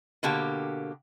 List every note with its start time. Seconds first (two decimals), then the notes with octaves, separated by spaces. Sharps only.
0.23 B2 D3 A#3 G4